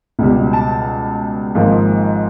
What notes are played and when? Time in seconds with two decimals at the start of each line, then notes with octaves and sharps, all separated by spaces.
0.19 C#2 B2 G3
0.53 A5
1.55 G#1 G#2 F3 A#3